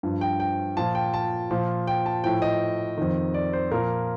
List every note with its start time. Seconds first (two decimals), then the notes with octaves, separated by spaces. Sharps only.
0.03 G2 F3
0.21 G5
0.40 G5
0.77 A#2 F3 A5
0.95 G5
1.14 A5
1.51 A#2 F3
1.87 G5
2.06 A5
2.24 A2 F3 G5
2.42 D#5
2.97 F2 D#3
3.34 D5
3.53 C5
3.71 A#2 F3 A#4